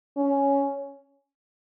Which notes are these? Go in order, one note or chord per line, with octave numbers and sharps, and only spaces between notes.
C#4